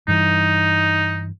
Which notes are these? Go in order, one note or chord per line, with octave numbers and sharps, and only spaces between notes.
G2 E3 D#4